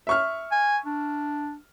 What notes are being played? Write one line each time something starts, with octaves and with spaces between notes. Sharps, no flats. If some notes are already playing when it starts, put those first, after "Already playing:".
E5 C#6 F6
G#5
D4